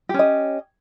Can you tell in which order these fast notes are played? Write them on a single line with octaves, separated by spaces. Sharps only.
G4 C#4 D#5